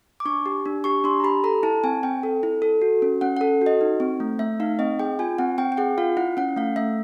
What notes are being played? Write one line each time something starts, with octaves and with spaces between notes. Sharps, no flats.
D6
D4 C#6
G4
D4
G4 C#6
D4 C6
A#5
G4 B5
A4 A#5
E4 A5
C4 G#5
C4 G5
A4
E4
A4
F#4
C#4
C#4 F#5
F#5
A4
F#4 D#5
D#4
C4
A3
A3 E5
D#4 F5
C4 D#5
G#4 G5
F4 G#5
C4 F#5
C4 G5
G5
G#4 F#5
F4 F5
E4 F#5
C#4 F#5
A3 F5
A3 E5